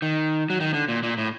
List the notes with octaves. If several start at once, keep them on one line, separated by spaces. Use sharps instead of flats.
D#3
F#3
D#3
D3
A#2
A#2
A2